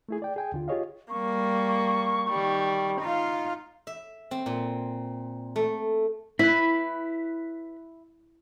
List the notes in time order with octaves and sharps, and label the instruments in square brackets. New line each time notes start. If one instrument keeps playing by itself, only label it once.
[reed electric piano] A3 E4 G#4
D5 G5
G#4 G5 G#5
D#2 D3 F4
F4 G4 G#4 C#5 D#5 F5
[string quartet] G3 A#3 [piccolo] C#6
[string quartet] D#3 G3
D#4 F4 F5
[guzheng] E5
C4
A#2
A3
[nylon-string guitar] E4 [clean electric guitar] B4 B5